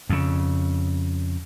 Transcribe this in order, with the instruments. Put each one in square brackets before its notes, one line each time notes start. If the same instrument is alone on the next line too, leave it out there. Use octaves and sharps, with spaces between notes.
[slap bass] F2 C#3